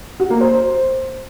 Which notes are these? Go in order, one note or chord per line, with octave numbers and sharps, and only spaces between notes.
F#4
A#3
C5